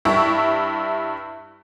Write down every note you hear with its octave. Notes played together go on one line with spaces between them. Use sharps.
G2 E4 C#6